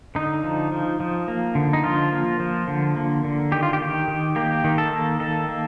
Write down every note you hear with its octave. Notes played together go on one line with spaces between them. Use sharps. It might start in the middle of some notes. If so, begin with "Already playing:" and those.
D3 D#4
F3
F3
F3
A#3
D3
D#4
F3 F4
A#3
F3
D3
A#3
D3
D#3 G4
F4
G4
D#3
D#3
A#3 G4
D#3
A4
A#3
D#3 A4
A#3